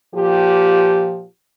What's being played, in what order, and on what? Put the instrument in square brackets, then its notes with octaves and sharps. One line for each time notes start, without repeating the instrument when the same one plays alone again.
[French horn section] A#2 F3 G4